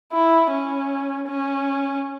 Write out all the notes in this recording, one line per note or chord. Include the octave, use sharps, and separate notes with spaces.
E4
C#4
C#4